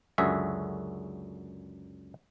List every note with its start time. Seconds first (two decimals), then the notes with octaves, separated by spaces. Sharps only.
0.18 C#2 F#2 D3 F#4 G#4 E5